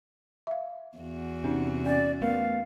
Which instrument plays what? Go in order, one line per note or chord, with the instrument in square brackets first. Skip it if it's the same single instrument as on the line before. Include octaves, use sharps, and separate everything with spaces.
[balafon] E5 F5
[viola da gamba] E2 F#4
[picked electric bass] C3 [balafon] C#4 D#4
[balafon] C#4 [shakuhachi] D5
[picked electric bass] A3 B3 [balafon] A#4 [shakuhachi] F5